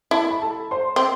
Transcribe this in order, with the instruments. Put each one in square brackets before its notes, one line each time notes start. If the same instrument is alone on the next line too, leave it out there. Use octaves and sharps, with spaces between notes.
[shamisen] E4 [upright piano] A4 A5
[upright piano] B5
A4 A5
C5 C6
[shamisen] C4